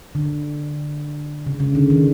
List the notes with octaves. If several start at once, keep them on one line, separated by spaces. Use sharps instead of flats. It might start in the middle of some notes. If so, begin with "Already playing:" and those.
D3
C#3
C#3
D3
D#3